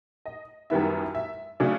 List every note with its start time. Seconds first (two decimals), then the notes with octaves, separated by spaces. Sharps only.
0.26 D#5
0.70 F#2 D#3 G3 B3 E4 E5
1.15 E5
1.60 C#3 F#3 A3 D4